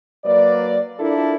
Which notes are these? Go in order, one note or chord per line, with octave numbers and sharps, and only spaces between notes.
F#3 A#3 B4 D5
D4 E4 F4 A4 A#4